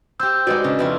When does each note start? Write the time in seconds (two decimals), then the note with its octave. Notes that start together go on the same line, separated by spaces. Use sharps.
0.20 G4 C5 E6 G6
0.47 G#3 D#4 F#4 B4 D5
0.64 C#3 D4
0.79 F2 E4 F4 B4